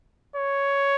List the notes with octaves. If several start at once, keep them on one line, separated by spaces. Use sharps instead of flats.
C#5